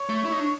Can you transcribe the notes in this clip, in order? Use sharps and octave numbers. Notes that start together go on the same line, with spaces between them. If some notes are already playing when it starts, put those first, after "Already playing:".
Already playing: C#5
A3
E4
D#4
D4